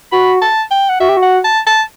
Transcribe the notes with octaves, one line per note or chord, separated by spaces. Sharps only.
F#4 B5
A5
G5
F#5
F#4 E5
G4
F#4
F#5
A5
A5